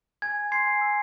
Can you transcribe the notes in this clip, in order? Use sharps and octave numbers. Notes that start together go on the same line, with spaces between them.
G#5 G#6
G#5
C6 G#6 C7
G#5
E6